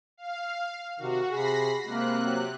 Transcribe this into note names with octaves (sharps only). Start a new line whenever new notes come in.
F5
C3 D#3 F#4
C3 G#4 B5 A#6 C7
C3 G#3 A#3 F#6
F#3